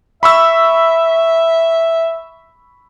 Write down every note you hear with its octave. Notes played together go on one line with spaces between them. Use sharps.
E5 B5 C#6 E6